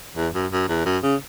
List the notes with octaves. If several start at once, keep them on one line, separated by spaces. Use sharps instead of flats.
E2
F#2
F#2
E2
F#2
C#3